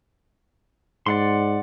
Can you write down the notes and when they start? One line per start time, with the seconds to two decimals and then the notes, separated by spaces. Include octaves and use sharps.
1.06 G#2 D5 F#5 C6